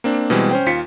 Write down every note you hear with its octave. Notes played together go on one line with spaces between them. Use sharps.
A#3 C4 D4
B2 E3 G3 G#3 C4
C#4 C5 G5
D#2 F4 B6 C#7